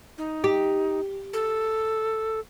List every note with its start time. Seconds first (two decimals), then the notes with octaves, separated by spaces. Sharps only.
0.18 D#4
0.44 G4
1.33 A4